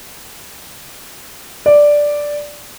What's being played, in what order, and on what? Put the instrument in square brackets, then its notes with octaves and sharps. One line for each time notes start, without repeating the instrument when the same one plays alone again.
[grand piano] D5